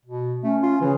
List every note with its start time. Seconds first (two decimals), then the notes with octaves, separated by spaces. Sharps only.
0.06 B2
0.43 A3 C#4
0.63 F4
0.81 C#3 E3